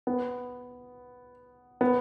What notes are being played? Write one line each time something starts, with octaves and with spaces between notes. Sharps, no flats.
B3
B3